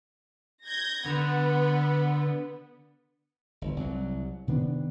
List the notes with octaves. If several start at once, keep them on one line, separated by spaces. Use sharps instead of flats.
G6 G#6 A#6
D3 B3
G1
C2 F#3
C3 D#3 B3 D4